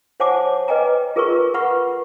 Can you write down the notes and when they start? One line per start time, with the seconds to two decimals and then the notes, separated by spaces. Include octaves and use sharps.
0.20 C5 C#5 F#5 G#5 A5 D6
0.68 B4 D#5 G5 G#5 A#5
1.16 F4 G#4 A#4 B4 A#5 C#6
1.54 B4 F#5 B5 C#6